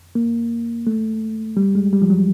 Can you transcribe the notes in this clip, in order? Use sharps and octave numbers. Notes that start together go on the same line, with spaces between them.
A#3
A3
G3
G#3
G3
F3
F#3